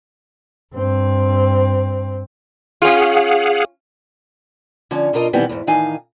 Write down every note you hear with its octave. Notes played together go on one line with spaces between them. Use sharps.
G2 C4
C#4 F4 G#4 F5 F#5
D3 F3 C#4
B2 D4 F4 A#4 D#5
B2 D#3 E3 G3 B3 C4
E2 G#2
A2 D#3 E3 D#4 F5 G#5